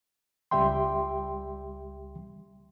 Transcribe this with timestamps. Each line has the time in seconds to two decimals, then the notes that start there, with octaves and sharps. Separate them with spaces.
0.51 C#2 G3 G4 E5 G5 C6